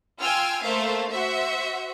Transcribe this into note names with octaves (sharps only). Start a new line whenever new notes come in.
F4 G5 G#5 E6 F6
A3 A#3 C5 E5 F5
F#4 C5 E5